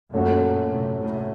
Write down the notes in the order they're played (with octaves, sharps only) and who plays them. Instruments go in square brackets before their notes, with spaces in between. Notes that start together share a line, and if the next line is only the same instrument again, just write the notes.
[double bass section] F#2 A#2 [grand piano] F#3 A3 C#4 F#4
[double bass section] A2 C3
A2 C3